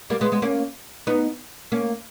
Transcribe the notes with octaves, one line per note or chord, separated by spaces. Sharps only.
G3 A#3
G#3 B3
G#3 B3
A#3 C#4
B3 D#4
A#3 C#4